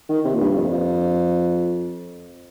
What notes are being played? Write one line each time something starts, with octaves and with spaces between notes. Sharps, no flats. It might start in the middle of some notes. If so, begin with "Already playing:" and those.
D#3
C3
A#2
G2
F2